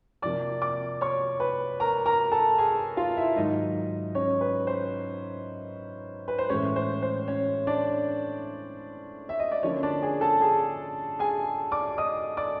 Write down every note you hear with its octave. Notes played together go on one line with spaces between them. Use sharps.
F2 C3 F3 A#3 D5 D6
D5 D6
C#5 C#6
B4 B5
A#4 A#5
A#4 A#5
A4 A5
G#4 G#5
F4 F5
E4 E5
G#2 D#3 F#3 D#4 D#5
C#4 C#5
B4
C5
B4
C5
A2 E3 G#3 C#4 C#5
C5
C5
C#4 C#5
D4 D5
E5
D#5
D5
D3 F3 A#3 C#4 C#5
D4 D5
G#4 G#5
A4 A5
G#4 G#5
G#4 G#5
D5 D6
D#5 D#6
D5 D6